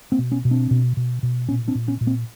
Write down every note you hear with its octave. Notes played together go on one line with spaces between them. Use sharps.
A#3 C4
B2
B3 C#4
B2
C4 D4
B2
B2
B2
A#2 B3 C#4
C4 D4
A#2
B3 C#4
A#2
A#3 C4